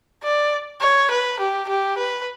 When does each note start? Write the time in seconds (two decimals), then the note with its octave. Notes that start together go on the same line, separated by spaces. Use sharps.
0.23 D5
0.81 C#5
1.11 B4
1.40 G4
1.68 G4
1.98 B4